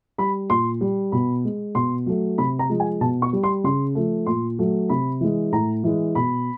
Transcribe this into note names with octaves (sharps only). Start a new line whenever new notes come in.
G3 B5
A#2 C6
G3
B2 B5
G#3
B2 C6
F#3 A3
C3 B5
A#5
F3 G#3
G#5
B2 A5
C#6
G3
C6
C#3 C6
F3 A3
A#2 C6
F#3 A3
C3 B5
E3 G#3
A2 A#5
E3 G#3
B2 B5